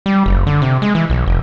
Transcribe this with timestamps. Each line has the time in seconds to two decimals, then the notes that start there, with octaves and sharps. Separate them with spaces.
0.06 G3
0.26 F#1
0.47 D3
0.62 C3
0.82 G#3
0.95 E3
1.10 B1
1.26 F1